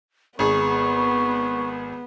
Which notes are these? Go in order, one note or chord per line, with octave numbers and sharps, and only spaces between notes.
G#1 B3 G#4 C#6